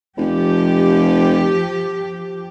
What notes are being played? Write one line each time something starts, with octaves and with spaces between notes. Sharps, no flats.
F1 F3 G4